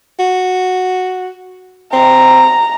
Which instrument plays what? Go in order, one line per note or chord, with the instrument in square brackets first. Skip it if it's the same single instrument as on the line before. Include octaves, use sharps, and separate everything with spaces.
[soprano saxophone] F#4
[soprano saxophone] C4 [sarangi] A#5